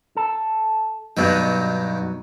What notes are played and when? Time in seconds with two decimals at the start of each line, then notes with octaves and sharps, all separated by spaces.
0.17 A4
1.17 G2 B2 D#3 F#3 B3 D#4